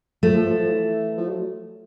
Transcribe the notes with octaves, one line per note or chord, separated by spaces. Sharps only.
F3 A3
F3
F3
F3
E3
F3
F#3